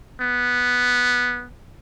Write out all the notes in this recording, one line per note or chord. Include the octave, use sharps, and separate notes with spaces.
B3